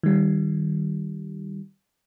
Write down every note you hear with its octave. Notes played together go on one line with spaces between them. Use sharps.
D#3 G3